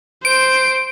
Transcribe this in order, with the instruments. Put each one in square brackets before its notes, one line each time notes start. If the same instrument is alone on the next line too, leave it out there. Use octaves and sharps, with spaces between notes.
[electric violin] C5 [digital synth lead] D7